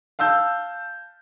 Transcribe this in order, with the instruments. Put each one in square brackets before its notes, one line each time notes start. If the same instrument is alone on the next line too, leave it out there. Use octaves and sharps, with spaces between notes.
[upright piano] F5 A5 E6 G6